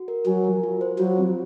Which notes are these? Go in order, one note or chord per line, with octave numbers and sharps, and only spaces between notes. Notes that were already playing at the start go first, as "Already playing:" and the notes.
Already playing: F#4
A#4
F#3 G#5
A#4
F4
C5
F#3 F4
C4